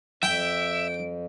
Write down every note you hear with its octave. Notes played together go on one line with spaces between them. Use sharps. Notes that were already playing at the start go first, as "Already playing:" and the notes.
F2 E5 G5 D7